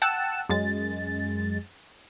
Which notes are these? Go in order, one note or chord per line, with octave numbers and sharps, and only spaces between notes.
F#5 G5 A5 E6
F#2 G#3 A6